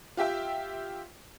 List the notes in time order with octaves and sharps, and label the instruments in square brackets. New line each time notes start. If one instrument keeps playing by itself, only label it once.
[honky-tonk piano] F4 G4 E5 G5